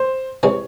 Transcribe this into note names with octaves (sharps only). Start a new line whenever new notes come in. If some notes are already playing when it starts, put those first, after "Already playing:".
Already playing: C5
C3 E3 G#3 C4 C#5